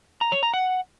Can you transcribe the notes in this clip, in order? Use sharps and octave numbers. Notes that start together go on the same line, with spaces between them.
A#5
C#5
A#5
F#5